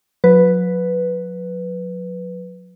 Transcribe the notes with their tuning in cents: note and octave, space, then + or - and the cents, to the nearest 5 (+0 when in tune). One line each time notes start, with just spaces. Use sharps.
F#3 -40 B4 +0